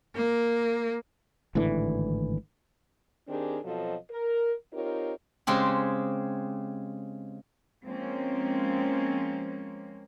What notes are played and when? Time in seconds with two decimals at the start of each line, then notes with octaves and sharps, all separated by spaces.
0.15 A#3
1.55 G#1 A2 D3 E3
3.29 D#3 C4 D4 G4 G#4 A#4
3.64 B2 F3 F#3 C4 A4 D#5
4.11 A#4
4.73 C4 D#4 F4 G4 A#4 C#5
5.47 C#3 G#3 C4 G4
7.85 F3 G#3 A#3 C4 C#4